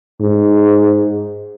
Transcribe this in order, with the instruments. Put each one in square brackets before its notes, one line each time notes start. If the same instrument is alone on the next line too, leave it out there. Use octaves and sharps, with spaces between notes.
[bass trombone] G#2